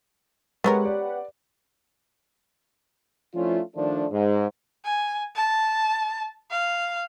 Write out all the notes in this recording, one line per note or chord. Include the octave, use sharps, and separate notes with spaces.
G#3 B3 C#4 G4 A#4 B4 F#5
D5
F3 A3 C#4 D4 E4 F4
D#3 F3 A3 D4
G#2
G#5
A5
F5